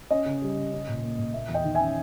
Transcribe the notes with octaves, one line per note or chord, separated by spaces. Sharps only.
C#4 D#5
C#3
G3
C#3
C#4
A#2
A#3
A#2
A#3 E5
E2
D#5 G5
D#3
E5 G#5
C#4